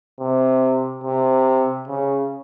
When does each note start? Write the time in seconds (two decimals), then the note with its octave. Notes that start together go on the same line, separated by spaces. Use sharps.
0.20 C3
1.04 C3
1.88 C#3